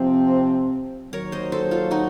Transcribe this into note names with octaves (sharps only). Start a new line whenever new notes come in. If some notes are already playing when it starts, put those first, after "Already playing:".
Already playing: C3 F3 C4 C5
D#2 D#3 F#3 A#4 C#5
C5 D#5
A4 C5
F4 A4
D#4 F#4